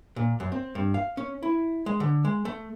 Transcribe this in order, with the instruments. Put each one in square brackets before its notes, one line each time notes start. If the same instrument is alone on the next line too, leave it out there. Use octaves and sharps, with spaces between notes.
[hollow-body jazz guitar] A#2
F#2
C4
G2
F5
C#4
E4
G#3
D3
G#3
A3